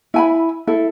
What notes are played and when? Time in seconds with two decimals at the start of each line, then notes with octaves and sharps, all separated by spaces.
0.14 E4 G#5 B5
0.67 E4 A4